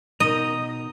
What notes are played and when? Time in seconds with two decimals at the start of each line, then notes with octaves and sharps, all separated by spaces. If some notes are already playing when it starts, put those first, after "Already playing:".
0.20 B2 D#4 D#5 A#5